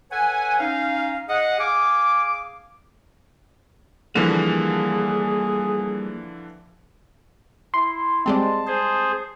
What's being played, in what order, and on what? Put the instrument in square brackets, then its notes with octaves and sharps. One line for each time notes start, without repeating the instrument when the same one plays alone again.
[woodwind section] A4 B4 C#5 F#5 G#5
C#4 D#4 F5
G#4 D#5 F#5
G#4 F5 G#5 D6
[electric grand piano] D3 E3 F3 [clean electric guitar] G3 A#3 [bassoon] G#4
[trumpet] E4 [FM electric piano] C6
[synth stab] G3 G#3 C4 [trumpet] A5
[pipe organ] G#4 C5